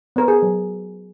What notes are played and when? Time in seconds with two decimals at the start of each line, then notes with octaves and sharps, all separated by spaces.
0.16 B3 A#4
0.28 G#4
0.42 F#3